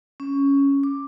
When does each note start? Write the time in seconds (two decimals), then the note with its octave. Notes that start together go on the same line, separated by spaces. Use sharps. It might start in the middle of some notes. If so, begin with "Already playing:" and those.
0.20 C#4
0.84 D6